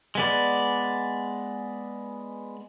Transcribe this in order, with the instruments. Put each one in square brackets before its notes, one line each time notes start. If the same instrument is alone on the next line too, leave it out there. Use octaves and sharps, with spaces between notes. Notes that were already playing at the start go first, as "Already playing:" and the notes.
[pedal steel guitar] G#3 B3 D5